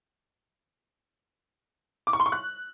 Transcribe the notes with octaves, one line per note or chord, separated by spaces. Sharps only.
D6
C#6
C6
C#6
F#6